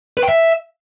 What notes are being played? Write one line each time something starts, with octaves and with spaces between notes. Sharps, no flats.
B4
G5
E5